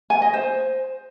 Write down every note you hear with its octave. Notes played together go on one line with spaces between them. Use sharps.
G#5
D#5
C5